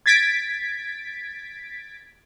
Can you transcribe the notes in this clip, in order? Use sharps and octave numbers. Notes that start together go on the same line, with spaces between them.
G#6 A6 B6 D7